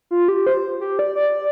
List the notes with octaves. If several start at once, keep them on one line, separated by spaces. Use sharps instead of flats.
F4
G4
C5
G4
D5
D5